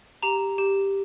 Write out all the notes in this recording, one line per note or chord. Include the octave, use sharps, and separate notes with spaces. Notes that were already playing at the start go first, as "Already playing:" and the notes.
G4 A#5
G4